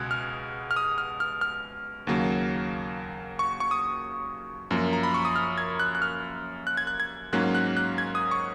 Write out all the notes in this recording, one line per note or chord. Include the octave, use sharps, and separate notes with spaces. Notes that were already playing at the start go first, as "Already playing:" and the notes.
Already playing: C#2 B2 G#3 B3 F#6 G#6
F6
F6
D#6
F6
F6
F6
D#2 C#3 F#3 A#3
C#6
C#6
D#6
F#2 F3 A#3
A#5
B5
C#6
D#6
F6
G#6
F#6
F#6
F6
F#6
G#6
F#6
G#6
G#2 F#3 A#3 C#4 F#6
F#6
F#6
G#6
D#6
C#6